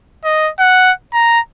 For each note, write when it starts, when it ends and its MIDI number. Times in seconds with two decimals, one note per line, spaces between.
0.24 0.50 75
0.59 0.91 78
1.13 1.39 82